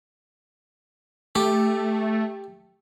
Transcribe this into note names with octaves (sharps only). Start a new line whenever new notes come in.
A3 G4